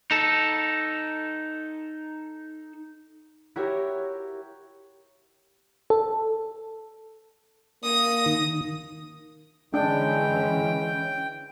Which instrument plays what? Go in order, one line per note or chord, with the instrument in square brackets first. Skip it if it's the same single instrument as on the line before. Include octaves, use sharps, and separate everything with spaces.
[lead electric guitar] D#4 A4
[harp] E4 F#4 G4 A#4 C#5
[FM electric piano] A4
[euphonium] A#3 [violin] D#6 A#6
[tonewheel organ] D#3
[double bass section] D3 E3 C#4 [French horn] G#3 [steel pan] D4 [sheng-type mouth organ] G5